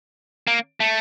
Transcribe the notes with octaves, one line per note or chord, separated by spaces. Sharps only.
A#3
A3